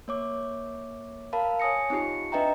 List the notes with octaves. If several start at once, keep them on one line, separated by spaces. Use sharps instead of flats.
A#3 C#5 D6
A#4 F5 A5 B5
C#5 G#5 D#6 A#6 C#7
C4 D#4 F4 G4 C#7
D4 B4 D#5 E5 G5 A#5